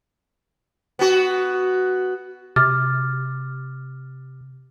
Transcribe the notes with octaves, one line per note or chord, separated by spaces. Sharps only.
B3 F#4
C3 D6 F6 A6